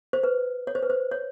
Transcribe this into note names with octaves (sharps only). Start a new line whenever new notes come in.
C5
B4
C#5
C5
B4
C5
C#5